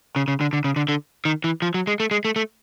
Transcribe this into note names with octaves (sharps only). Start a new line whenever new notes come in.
C#3
C#3
D3
D3
C#3
D3
D3
D#3
E3
F3
F#3
G#3
A3
G#3
A3
A3